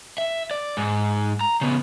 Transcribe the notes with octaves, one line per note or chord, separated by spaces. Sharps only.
E5
D5
G#2
A#5
C#3 B3